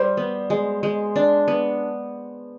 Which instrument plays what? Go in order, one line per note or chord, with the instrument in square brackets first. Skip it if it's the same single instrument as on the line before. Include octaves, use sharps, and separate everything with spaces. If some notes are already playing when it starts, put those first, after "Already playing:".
Already playing: [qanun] G3 [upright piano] C5
[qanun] B3
G#3
G#3
D4
B3